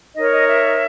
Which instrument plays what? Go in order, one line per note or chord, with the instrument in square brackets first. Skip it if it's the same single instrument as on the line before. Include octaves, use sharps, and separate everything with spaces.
[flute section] D#4 A#4 C#5 D#5
D#5
E5